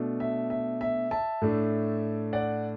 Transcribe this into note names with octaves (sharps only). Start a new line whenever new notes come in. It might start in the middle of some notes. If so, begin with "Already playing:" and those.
Already playing: B2 A3 D4
E5
E5
E5
E5 A5
A2 A3 D4
D5 F#5